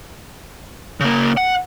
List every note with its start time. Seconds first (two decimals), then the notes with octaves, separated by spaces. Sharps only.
1.00 C#3 A#3
1.37 F#5